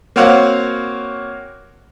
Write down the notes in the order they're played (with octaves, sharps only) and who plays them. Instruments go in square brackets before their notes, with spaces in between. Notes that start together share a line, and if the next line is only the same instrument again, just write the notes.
[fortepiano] A#3 C4 F#4 C#5 F5 F#5